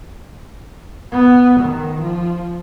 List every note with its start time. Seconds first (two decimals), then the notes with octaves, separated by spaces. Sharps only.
1.12 B3
1.61 D#3
2.02 F3